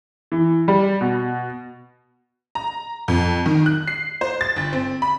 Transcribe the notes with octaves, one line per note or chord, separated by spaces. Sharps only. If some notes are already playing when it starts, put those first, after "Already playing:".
E3
G3
B2
A#5
F2
D#3
F#6
C7
C5
A6
G1
C4
B5